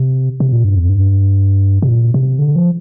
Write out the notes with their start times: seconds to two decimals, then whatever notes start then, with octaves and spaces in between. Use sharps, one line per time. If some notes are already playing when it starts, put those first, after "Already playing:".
Already playing: C3
0.40 C3
0.52 A#2
0.64 G2
0.77 F2
0.89 G2
1.82 C3
1.89 A#2
2.14 C3
2.39 D3
2.56 F3